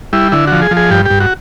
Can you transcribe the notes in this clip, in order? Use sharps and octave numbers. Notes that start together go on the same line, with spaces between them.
G3 E4
D3 E4
F3 F#4
G#4
F3
G#4
G2 G4
G2 G4
F#4